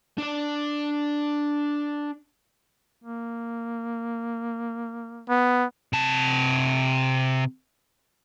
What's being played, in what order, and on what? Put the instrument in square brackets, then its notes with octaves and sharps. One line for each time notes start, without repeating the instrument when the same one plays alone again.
[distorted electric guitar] D4 D5
[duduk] A#3
[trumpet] B3
[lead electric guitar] C3 A5